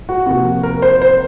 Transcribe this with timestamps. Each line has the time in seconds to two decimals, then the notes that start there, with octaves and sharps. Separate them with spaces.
0.09 F#4
0.26 C3 F3 A#3 F#4
0.63 A#4
0.82 C5
1.02 C5